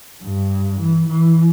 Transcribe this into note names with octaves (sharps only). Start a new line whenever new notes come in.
G2
E3
E3